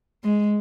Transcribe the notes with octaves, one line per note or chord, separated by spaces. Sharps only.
G#3